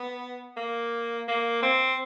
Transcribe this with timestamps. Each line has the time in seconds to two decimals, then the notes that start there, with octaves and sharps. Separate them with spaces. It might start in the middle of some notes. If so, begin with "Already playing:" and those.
Already playing: B3
0.57 A#3
1.28 A#3
1.62 C4